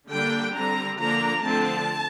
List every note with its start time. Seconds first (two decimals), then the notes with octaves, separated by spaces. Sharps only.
0.10 D3 G3 A#3 D4 G5
0.54 D3 G3 C4 A#5
0.99 D3 F3 A#3 D4 A#5
1.43 D3 F3 A3 C4 A5